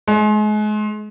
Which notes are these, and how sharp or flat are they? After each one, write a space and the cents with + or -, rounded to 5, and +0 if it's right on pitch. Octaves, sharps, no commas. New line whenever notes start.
G#3 +35